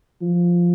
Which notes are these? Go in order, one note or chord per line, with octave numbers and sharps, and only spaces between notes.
F3